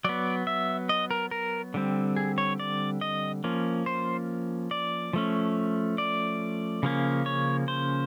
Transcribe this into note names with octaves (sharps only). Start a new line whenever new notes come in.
F#3 B3 D5
E5
D#5
A#4
A#4
D3 G3 C4
G#4
C#5
D5
D#5
F3 A#3 C#4
C5
D5
F3 A3 C#4
D5
C#3 F3 A#3 C#4
C#5
C5